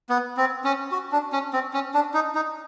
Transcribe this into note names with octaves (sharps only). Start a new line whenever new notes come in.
B3
C4
C#4
F#4
D4
C#4
C4
C#4
D4
D#4
D#4